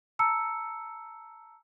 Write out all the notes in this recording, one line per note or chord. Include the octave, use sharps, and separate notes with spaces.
A5 A#5 E6 C#7